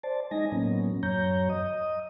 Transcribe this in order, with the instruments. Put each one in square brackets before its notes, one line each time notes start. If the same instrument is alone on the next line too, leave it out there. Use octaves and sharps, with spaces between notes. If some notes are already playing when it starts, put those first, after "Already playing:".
[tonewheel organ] C5 D5 A5
G#3 D#4 D#5 G#5 A#6
A2 F#3 A#3 B3 C#4
F#2 F#3 C#5 A#5 G6
D#5 D#6